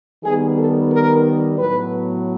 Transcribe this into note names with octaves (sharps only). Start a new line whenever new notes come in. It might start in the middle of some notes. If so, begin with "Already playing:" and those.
D#3 G3 B3 G#4
A4
A#4
A2 F#3 B3 B4